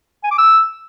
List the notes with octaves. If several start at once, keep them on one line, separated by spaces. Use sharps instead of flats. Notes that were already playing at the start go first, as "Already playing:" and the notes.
G#5
D6
E6